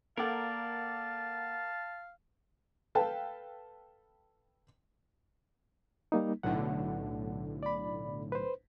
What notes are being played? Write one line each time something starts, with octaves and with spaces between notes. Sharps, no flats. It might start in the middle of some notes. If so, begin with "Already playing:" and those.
A#3 A4 A#4 D5 F5 F#5 A5
A4 B4 F5 G5 A5
G3 A#3 D#4
B1 A2 D3 F#5
D5 B5
B4 C5